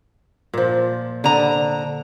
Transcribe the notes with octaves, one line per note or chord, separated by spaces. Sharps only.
A#2 F3
D3 A#5